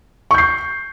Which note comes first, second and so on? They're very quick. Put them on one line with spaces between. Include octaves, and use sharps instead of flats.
C#6 G6 C7